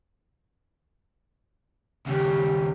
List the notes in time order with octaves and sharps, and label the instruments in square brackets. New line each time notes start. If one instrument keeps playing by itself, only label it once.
[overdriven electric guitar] D#2 C#3 [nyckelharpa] G4